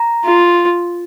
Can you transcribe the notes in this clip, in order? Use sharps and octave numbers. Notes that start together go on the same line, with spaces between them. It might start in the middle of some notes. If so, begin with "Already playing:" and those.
Already playing: A#5
F4